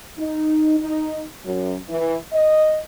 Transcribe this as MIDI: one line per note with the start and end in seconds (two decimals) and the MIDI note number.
0.18 0.77 63
0.80 1.21 63
1.45 1.75 42
1.88 2.16 52
2.33 2.78 75